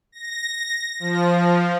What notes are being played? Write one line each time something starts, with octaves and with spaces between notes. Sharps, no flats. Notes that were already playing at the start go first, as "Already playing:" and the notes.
A#6
F3